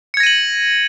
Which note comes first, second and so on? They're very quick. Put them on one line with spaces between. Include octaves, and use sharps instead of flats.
C#7 G#6 A#6 D#7 F#7